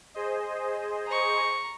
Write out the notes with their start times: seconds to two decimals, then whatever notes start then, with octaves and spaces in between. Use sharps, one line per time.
0.14 G#4 C5 D#5
1.07 A#5 C#6